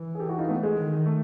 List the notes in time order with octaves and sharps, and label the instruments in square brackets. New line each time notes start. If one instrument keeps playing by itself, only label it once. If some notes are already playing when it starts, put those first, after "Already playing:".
Already playing: [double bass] E3
[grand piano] G#4
G4 A4
E4 F#4
D#4 F4
A3 B3
G#3
[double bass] D#3
[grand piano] A3